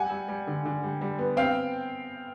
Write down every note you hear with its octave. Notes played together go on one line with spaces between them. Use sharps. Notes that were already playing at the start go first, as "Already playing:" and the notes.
Already playing: G3 F#5 G#5
G3
G3
D3
D3
G3
G3
B3
C4 F5 G5